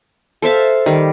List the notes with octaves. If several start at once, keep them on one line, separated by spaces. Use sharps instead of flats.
A4 C5 E5 F5
D#3 G3